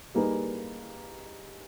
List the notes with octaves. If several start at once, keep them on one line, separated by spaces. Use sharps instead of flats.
G3 A#3 D#4 G#4 B4